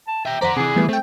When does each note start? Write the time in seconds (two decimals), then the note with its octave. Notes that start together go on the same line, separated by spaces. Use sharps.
0.08 A5
0.26 E5 G5 A#5
0.41 F2 C5 D5 F#5 A#5 B6
0.56 C3 E3 G#4
0.76 E3 G3 A3 B3
0.89 A3 C4 G5